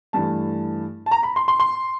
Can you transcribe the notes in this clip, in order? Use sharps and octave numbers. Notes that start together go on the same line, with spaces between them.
G2 E3 A3 A5
A5
A#5
B5
C6
C6
C6